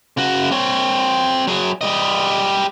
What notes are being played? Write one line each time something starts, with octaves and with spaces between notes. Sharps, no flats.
C#3 F#4
C4 C#5
F#3 G#4
G3 D#5